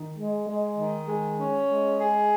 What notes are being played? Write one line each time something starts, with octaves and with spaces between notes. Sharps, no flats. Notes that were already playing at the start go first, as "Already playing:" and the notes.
Already playing: D#3
G#3
G#3
D#3
G#3
C#4
G#3
G#4